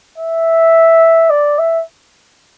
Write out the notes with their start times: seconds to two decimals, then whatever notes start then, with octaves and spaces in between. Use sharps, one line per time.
0.18 E5
1.30 D5
1.59 E5